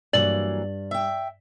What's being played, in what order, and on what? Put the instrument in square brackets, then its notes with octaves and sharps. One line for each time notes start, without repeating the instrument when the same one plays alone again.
[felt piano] G2 [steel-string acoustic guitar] E3 F#3 A#3 [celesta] D5 A6 F#7
[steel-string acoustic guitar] E5 G5